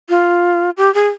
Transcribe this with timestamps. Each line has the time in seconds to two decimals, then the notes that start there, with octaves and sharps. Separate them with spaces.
0.09 F4
0.77 G4
0.94 G#4